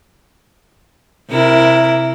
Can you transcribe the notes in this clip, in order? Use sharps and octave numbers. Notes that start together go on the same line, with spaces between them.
C3 E4 A#4